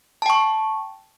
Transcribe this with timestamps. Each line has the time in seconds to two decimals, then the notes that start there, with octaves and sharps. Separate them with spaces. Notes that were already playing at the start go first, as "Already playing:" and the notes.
0.22 A5
0.26 G5
0.30 C#6